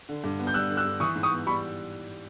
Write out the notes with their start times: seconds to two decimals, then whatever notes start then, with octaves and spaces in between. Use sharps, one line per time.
0.09 D3
0.24 G2
0.39 B3
0.47 G6
0.54 G3 E6 F#6
0.70 D3
0.77 E6 F#6
0.85 G2
1.00 E3 C#6 D#6
1.15 G#2
1.23 C#6 D#6
1.31 B3
1.46 G3 B5 C#6